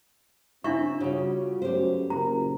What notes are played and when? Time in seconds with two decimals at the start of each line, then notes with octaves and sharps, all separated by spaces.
0.64 C#3 C4 D4 E4 F4 E5 C#6
1.00 C#3 G3 F4 F#4
1.62 F#2 F#3 A3 B3 G4 C5
2.10 F#1 A#2 A#4 A#5